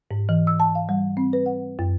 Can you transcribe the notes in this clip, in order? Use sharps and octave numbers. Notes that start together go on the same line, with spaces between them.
G#2
E3
E6
A5
F5
G3
C4
B4
F#5
F#2